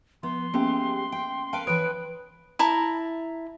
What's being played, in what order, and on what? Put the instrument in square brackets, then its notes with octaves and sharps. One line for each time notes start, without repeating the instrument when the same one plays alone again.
[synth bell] F3 [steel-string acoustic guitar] B3 [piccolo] C6
[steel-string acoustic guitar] G3 G4 G#4 [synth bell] A#3 B3 C#4
[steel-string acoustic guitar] G5
[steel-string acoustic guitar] A#4 B4 F5 [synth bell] G5 A5 D7
[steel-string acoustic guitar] E3 C#5 [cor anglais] B4 [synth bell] D#6 [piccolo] D7
[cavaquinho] E4 A5 A#5